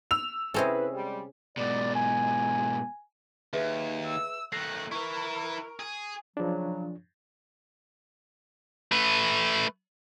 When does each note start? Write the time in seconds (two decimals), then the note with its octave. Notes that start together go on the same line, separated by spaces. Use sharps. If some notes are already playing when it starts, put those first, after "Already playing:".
0.11 E6 F7
0.54 C3 C4 C#4 E4 G#4 A4 B4 D#5
0.93 G3 G#3
1.57 G#2 B2 D5
1.95 G#5
3.53 D#2 G#4 B4 E5
4.06 E6
4.52 D#3 A3 F#6 A#6 C7
4.92 E4 A#4 B4 C#6
5.80 G#4
6.37 C#3 F3 F#3 D4
8.92 A3 B4